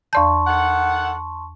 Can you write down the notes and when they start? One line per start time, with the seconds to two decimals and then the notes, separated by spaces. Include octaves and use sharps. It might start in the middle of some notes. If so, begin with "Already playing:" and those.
0.13 E2 D5 A5 C6 C#6 G6
0.47 D#3 A4 F#5